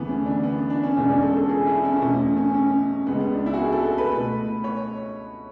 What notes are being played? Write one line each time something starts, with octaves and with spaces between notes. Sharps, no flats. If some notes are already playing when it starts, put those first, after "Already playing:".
Already playing: D2 C#3 E3 A3 B3
C#4
D4
B3
D4
C#4
E2 B2 G#3 C#4
D4
A4
A4
G#4
E4
C#4
E2 B2 A3 C#4
C#4
C#4
C#4
C#2 C#3 G#3 B3
B3
D4
E4
F#4
G#4
A4
A4
B4
B2 A3
C#5